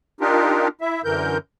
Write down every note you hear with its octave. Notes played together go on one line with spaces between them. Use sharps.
D4 D#4 F4 G4 A#4
E4 E5
F#2 D3 E3 A#4 G6